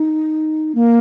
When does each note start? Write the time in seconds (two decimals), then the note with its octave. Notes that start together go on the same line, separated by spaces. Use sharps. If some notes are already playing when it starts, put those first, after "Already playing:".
Already playing: D#4
0.75 A#3